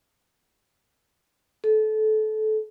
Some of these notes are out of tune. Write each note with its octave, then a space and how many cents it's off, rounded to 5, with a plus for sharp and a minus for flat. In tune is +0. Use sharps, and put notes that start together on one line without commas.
A4 -25